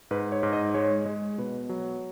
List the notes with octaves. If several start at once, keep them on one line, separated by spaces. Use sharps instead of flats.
G#2 B4
C#5
G#2
D#5
G#3 C#5
G#3
B2 B4
F#3